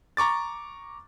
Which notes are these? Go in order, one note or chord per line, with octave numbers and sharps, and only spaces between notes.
A#5 C#6 D6 A6